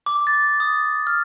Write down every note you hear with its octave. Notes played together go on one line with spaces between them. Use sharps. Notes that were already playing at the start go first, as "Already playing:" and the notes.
D6
A6
D#6
F6